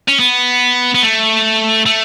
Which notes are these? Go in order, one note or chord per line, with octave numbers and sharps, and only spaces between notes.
C#4
B3
B3
A3
A3